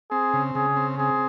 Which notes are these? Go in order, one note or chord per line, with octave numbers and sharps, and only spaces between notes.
C4 G#4
C#3
C#3 G#4
C4
C4 G#4